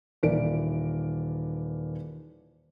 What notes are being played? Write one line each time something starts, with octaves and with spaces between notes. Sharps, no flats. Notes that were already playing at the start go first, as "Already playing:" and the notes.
D#1 E3 A#4 D5 D7